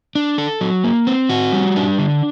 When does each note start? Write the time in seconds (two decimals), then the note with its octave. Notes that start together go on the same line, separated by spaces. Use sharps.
0.15 D4
0.38 A4
0.61 F#3
0.84 A#3
1.07 C4
1.29 F#4
1.53 G3
1.76 D4
1.98 D3